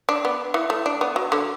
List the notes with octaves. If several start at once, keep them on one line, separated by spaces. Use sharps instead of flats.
D4
B3
E3
A3
D4
B3
F#3
D3